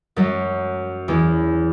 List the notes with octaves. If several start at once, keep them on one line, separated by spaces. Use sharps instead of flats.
F#2 F#3
E2 E3